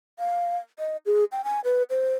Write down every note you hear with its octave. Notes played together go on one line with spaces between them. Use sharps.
F5
D#5
G#4
G5
G#5
B4
C5